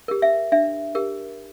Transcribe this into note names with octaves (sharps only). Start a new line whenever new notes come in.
G4 A#4
E5
D4 E5
G4 A#4